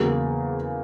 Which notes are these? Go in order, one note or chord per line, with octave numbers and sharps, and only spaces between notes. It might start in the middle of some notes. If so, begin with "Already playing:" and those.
Already playing: E2 C#3 F#3 A#3